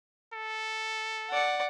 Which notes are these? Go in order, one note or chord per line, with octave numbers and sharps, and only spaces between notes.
A4
D5 F#5